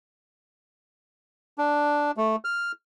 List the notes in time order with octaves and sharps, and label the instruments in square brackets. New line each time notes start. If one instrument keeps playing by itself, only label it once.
[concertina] D4
A3
F6